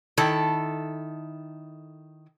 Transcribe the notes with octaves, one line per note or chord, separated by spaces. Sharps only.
D#3 E4 A4